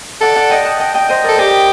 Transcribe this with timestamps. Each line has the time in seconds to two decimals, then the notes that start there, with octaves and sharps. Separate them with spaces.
0.21 A4 D5 F#5
0.36 D5 F#5
0.50 D#5 G5
0.65 F#5 A5
0.80 D#5 G5
0.94 D#5 G5
1.09 C5 D#5
1.24 A4 A#4 D5
1.38 G4 C5 D#5